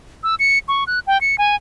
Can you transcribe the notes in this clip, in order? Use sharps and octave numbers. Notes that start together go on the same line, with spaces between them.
E6
C#7
C#6
F#6
G5
C#7
G#5